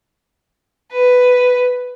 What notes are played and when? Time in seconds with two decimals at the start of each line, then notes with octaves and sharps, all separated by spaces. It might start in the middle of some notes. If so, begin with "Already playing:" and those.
0.92 B4